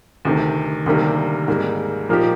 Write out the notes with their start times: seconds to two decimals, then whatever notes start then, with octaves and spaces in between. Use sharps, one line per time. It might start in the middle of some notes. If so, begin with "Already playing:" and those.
0.25 D2 C3 D#3
0.86 D2 C3 D#3 G3 A#3
1.48 G#2 G3 A#3
2.09 A#2 F3 A#3 D#4 G4